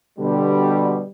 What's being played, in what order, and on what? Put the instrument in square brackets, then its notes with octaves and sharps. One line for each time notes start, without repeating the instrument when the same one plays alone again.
[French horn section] B2 D3 [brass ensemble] G3